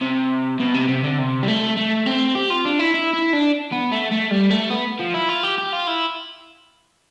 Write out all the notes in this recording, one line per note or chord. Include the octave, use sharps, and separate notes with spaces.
C3
B2
C3
C3
D3
C3
G3
A3
A3
C4
G4
F4
D4
E4
E4
E4
D4
B3
A3
A3
G3
A3
B3
F3
E4
F4
G4
G4
F4
E4